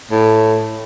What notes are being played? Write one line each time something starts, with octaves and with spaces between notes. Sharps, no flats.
A2